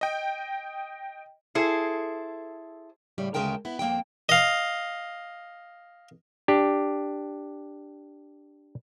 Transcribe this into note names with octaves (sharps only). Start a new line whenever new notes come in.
D#5 G5
E4 G#4 A4 C5
A2 C#3 G3
D2 C#3 G#3 A#4 G5 A5
B3 E4
F2 A#3 C4 G5
D#5 F5
D4 G4